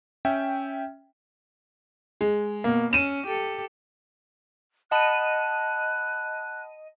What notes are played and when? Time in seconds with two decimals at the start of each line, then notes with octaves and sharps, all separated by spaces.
0.25 C#4 E5 G5
2.21 G#3
2.64 B2 A#3
2.93 C#4 D#7 E7
3.26 G4 A4
4.91 D#5 F#5 A5 B5 F#6 D#7